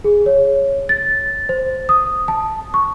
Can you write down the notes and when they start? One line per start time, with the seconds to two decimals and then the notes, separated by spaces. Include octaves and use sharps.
0.04 G#4
0.26 C#5
0.89 A6
1.49 C5
1.89 D#6
2.28 A5
2.74 C#6